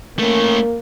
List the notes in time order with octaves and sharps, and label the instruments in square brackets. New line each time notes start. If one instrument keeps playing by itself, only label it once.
[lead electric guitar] A3 C#4 [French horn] A#3